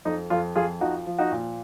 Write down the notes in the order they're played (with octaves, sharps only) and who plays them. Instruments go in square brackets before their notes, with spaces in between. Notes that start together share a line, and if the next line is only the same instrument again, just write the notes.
[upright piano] F2 D#4
F2 F4
F2 F4 G#4
F3 D#4 F#4
F3
D#4 F#4
A#2